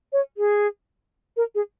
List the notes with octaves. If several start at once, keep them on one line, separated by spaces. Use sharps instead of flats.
C#5
G#4
A#4
G#4